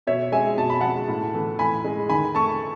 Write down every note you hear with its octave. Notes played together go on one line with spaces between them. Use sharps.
B2 C#5 E5
G#3 E5 G#5
B2 A5
B5
G#3 F#5 A5
A2
E3 A3
A2 G#5 B5
G#3
D#3 G#5 B5
A3 A5 C#6